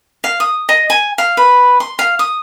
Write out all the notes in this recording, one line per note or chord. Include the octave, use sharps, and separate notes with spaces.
F5
D#6
D#5
G#5
F5
B4
C6
F5
D#6